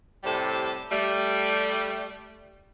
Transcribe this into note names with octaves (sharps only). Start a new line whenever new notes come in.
A2 C3 G3 A4
G3 A3